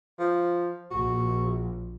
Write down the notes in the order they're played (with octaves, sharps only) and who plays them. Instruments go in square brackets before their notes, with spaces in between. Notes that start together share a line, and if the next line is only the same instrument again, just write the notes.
[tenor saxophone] F3
[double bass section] A#1 [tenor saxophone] F#4